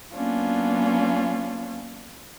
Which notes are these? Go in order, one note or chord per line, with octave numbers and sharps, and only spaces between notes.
F#3 A#3 B3 C#4 D4 F4